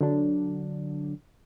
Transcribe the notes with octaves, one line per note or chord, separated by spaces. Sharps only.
D3 F#3 D4